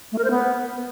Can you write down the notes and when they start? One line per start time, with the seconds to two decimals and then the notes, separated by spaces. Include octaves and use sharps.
0.12 A3
0.18 A#4
0.24 C5
0.30 B3